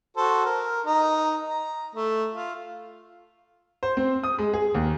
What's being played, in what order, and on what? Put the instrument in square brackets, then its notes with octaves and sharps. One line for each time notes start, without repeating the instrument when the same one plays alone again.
[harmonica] F#4 A4 C5
A#4
D#4 A#5
A#5
A3
F4
[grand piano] C5
C4
D#6
G#3
G#4
D#2